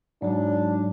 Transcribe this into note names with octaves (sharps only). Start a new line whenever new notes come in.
G#2 F#3 D4